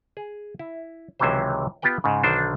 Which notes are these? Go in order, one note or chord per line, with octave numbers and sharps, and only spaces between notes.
G#4
E4
C#2 C3 D#3 E3 F#3 C5
B3 F4 G4 B4 G5
G#2 C#3
B1 D3 D#3 D4 C5